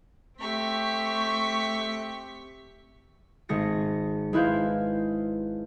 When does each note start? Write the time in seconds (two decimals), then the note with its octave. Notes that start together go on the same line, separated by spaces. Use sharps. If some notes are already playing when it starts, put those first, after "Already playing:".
0.40 A3 C4 G4 C#6 B6
3.49 G#1 G#3 G#4 A#6 C#7
4.33 G#3 E4 B4 C5 F5